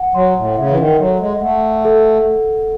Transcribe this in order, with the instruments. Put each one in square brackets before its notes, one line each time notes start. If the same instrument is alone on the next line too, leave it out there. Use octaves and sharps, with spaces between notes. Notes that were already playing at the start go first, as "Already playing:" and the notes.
Already playing: [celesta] F#5
[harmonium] F#3 [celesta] C6
[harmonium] A2
[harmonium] C#3 [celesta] E5
[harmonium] E3
D#3
[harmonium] F#3 [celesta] A4
[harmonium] G#3
G#3
[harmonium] A3 [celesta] F#5
[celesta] A4